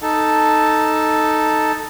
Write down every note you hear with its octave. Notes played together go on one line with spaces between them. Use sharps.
D#4 A4 A5